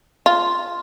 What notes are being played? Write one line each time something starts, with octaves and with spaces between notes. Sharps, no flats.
F4